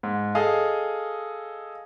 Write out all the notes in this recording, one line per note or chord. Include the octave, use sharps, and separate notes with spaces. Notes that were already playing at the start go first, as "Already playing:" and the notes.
G#2
G#4 A4 D#5 F5